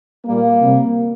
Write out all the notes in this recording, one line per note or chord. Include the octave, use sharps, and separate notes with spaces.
A#2 G3 A#3
C3 G3